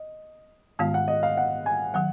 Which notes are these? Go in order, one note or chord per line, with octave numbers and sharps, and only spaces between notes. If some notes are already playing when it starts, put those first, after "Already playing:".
Already playing: D#5
G#2 D#3 G#3 B3 F4 F5
F#5
D#5
F5
F#5
G#5
D#3 F#3 F#5